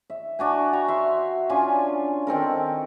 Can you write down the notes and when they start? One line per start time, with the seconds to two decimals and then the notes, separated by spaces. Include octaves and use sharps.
0.10 E5
0.39 D4 F#4 G#5
0.73 F#4 G5 A#5 C#6
0.88 E5 C6
1.49 C#4 D4 F4 G#5
2.27 D#3 C4 A4 A#4